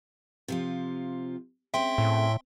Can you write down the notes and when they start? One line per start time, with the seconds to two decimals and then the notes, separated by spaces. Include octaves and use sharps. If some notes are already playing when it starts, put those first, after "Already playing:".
0.48 C3 F3 F4
1.74 G#3 C4 C#4 E5 G5 C6
1.98 A2